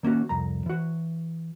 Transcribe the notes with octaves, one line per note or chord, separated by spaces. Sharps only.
D#3 A#3 C#4 F#4
C2 F2 A#5
E3 F#4